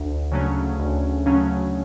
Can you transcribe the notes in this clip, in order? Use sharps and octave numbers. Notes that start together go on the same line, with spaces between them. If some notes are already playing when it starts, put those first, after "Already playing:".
Already playing: D2
C#3 F#3 A3 C#4
D2
C#3 F#3 A3 C#4